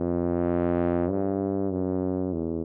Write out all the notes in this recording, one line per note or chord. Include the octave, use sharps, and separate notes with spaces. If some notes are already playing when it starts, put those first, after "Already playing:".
Already playing: F2
G2
F#2
E2